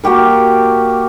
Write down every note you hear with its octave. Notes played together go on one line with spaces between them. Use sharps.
A#3 F#4 G4 A#4